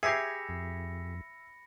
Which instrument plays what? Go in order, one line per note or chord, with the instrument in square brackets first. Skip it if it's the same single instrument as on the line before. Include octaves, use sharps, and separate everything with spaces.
[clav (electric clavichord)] G4 G#4 [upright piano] E5 G#6 C7 [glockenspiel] B5 A#6 C#7
[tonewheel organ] F2